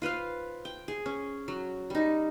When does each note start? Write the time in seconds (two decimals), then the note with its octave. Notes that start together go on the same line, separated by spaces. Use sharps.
0.02 F4 B4 C5 F5
0.65 G5
0.88 G#4
1.06 C#4
1.48 F#3
1.90 G3 D#4